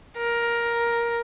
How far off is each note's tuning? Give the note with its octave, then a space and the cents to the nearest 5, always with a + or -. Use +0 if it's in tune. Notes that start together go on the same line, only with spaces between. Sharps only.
A#4 +10